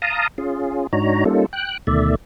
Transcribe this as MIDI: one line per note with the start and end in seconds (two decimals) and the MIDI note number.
0.02 0.28 77
0.02 0.28 81
0.02 0.28 82
0.02 0.28 87
0.38 0.87 61
0.38 0.87 65
0.38 0.87 68
0.93 1.24 44
0.93 1.24 62
0.93 1.24 63
0.93 1.24 66
0.93 1.24 73
0.93 1.24 82
1.25 1.46 55
1.25 1.46 58
1.25 1.46 61
1.25 1.46 63
1.25 1.46 65
1.25 1.46 69
1.53 1.77 79
1.53 1.77 90
1.87 2.15 38
1.87 2.15 47
1.87 2.15 51
1.87 2.15 57
1.87 2.15 74
1.87 2.15 76